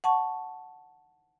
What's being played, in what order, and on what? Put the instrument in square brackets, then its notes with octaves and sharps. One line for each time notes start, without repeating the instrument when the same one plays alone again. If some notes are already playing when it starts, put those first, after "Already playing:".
[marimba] F#5 A5 C#6